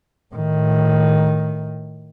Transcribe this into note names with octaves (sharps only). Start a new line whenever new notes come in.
A2 D#3